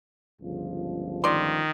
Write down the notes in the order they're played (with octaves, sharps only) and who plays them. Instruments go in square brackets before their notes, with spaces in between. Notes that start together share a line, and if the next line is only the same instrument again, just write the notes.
[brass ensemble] G1 C#2 F3
[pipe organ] D#3 [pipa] D5 C6